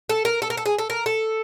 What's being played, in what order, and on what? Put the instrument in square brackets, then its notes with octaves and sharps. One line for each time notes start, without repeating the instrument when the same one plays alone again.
[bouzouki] A4
A#4
A4
A#4
A4
G#4
A4
A#4
A4